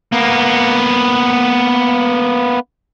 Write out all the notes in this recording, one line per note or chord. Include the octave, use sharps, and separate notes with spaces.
A#3 B3